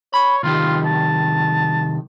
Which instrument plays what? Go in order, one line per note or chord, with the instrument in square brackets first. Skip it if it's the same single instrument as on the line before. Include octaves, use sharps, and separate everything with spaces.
[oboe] C#5 [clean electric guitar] B5
[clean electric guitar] C2 D#3 G4 [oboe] F4
[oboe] A5